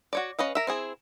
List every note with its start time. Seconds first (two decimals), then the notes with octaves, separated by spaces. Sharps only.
0.13 F#4 C#5 D5
0.39 C#4 B4 D#5 F5
0.55 A#4 E5
0.67 C4 E4 G#4